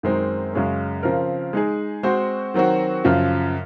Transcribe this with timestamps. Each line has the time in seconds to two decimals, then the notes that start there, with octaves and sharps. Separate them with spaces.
0.03 F#2 D#3 G#3 C4 D#4
0.53 F#2 C#3 G#3 C#4
1.03 C#3 F3 C4 F4 A#4
1.53 G#3 D#4 G#4
2.03 G#3 C4 F#4 C5
2.54 D#3 F#3 C4 F#4
3.04 F#2 C#3 F3